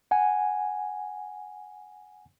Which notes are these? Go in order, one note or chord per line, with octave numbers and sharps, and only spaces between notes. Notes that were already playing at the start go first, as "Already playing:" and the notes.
F#5 G#5